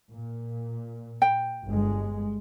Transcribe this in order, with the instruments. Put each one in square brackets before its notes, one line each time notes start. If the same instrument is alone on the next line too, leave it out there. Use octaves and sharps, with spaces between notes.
[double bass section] A#2
[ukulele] G5
[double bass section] G1 G#3